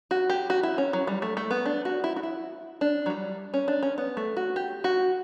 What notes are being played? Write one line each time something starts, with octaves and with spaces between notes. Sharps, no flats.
F#4
G4
F#4
E4
C#4
F#3
G3
A3
A3
B3
D4
F#4
E4
F#4
E4
D4
F#3
G3
C#4
D4
C#4
B3
A3
F#4
G4
F#4